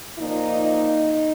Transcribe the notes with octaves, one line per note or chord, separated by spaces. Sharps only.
A#2 F3 A#3 D#4